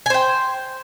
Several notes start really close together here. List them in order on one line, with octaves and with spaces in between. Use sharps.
G#5 C5 G5